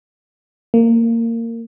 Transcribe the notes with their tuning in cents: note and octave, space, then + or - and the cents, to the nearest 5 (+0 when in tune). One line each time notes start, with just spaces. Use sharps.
A#3 -20